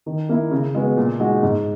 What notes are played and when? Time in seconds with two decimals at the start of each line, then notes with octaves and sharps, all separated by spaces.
0.06 D#3
0.29 A#3 E4
0.51 C#3
0.74 G#3 B3 F#4
0.97 A#2
1.20 G#3 D#4 F#4
1.43 G#2